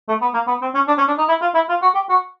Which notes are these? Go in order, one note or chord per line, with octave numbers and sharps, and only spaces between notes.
A3
B3
A#3
B3
C4
C#4
D4
C#4
D4
D#4
E4
F4
E4
F4
F#4
G4
F#4